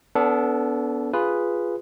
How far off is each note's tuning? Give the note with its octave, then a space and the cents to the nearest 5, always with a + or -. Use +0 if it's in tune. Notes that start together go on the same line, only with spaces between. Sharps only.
B3 +0 D4 -35 A4 +0
F4 +0 G#4 -5 B4 +0